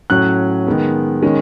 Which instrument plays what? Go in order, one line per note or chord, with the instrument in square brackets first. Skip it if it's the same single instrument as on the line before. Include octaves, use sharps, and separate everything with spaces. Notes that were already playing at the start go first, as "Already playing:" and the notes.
[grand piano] A2 F#3 C#4 F#6
D#3 G#3 B3
D#3 G#3 C#4